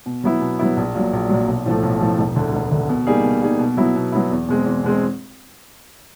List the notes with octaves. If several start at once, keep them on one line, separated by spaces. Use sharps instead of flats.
B2
F#3 B3 E4
B2
F#3 B3 E4
A#1
A#2 F#3
A#1
A#2 F#3
B1
A2 F3 A3
B1
A2 F3 A3
E1
D2 D3
E1
D2 D3
B2
G3 A#3 D#4 G#4
B2
G3 A#3 D#4 G#4
B2
F#3 B3 E4
B2
F#3 B3 E4
E2
B2 G#3 C4
E2
B2 G#3 C4